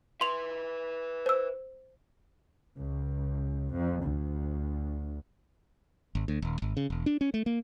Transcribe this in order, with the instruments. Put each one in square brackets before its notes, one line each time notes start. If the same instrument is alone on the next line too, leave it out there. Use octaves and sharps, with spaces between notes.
[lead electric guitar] B4 E5 [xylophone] C6 F7
[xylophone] C5 E6
[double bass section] C#2
F2
D2
[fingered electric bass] G#1
D2
D#1
G#1
C#3
E1
D4
C#4
A3
A#3